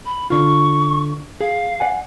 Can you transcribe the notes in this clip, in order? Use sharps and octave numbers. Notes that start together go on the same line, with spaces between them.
B5
D3 F4 C#6
G#4 F5
D5 F#5 G#5